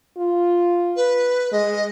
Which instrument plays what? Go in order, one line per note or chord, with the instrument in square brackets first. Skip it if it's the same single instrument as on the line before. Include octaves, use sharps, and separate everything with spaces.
[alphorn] F4
[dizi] B4
[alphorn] G#3 [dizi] D#5